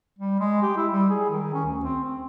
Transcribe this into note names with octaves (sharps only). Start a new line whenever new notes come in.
G3
G#3
G4
E4
G3
G#4
D#3
C#4
D2
C4
C4